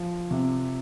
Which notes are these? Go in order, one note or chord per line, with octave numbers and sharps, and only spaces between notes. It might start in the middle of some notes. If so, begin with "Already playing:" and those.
Already playing: F3
C3